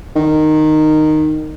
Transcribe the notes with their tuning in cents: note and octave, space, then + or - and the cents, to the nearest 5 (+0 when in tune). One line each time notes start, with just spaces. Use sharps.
D#3 -10